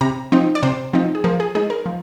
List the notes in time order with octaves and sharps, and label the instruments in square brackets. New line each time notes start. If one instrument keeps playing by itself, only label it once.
[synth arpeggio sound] C3 A#5
F3 C4 D#4
D5
C3 C5
F3 C4 D#4
G#4
F3 A#4
G#4
G#3 D#4 G#4
A#4
F3